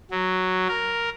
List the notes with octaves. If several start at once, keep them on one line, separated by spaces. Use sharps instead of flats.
F#3
A#4